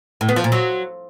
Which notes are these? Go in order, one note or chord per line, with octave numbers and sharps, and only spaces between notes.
A2
B3
F3
A#2
F#3